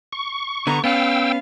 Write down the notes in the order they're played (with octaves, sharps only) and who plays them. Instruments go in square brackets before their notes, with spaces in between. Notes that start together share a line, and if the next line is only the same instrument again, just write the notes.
[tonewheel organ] C#6
[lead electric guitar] D3 B3 [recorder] A#5
[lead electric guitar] B3 C#4 [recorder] F5 [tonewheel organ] G5 E6